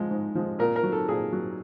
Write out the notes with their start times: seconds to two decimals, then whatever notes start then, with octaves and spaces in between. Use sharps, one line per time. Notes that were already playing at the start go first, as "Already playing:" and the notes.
Already playing: G#2 F3 G#3
0.11 G#2
0.35 F3 G#3
0.59 A#2 A#4
0.76 A#4
0.83 F#3
0.92 A4
1.08 A#2 G#4
1.33 F#3